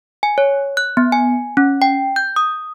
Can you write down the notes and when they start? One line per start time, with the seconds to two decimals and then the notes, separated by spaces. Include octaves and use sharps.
0.23 G#5
0.38 C#5
0.77 F#6
0.97 B3
1.12 G#5
1.57 C#4
1.82 G5
2.16 G6
2.36 D#6